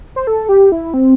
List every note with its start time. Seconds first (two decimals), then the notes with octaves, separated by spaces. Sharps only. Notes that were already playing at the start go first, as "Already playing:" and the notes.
0.16 C5
0.27 A4
0.49 G4
0.72 E4
0.94 C4